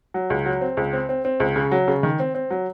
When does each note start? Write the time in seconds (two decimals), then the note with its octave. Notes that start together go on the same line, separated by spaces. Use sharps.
0.14 F#3
0.30 C#2
0.46 F#3
0.61 C4
0.77 C#2
0.93 C4
1.09 C4
1.25 C4
1.40 C#2
1.56 C#3
1.72 F#3
1.88 C#3
2.03 D#3
2.20 C4
2.35 C4
2.51 F#3